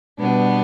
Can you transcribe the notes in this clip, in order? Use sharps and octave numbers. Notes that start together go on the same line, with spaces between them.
B2 G3 B3 D4